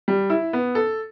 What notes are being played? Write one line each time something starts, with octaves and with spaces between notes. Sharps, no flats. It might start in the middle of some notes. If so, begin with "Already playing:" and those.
G3
E4
B3
A4